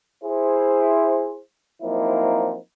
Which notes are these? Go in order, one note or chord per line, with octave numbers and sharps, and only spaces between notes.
E4 G#4 C5
F3 F#3 A#3 C4 D#4 E4